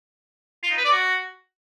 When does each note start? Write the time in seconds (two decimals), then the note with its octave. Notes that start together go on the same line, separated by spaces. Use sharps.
0.63 F4
0.70 D#4
0.77 B4
0.85 D5
0.92 F#4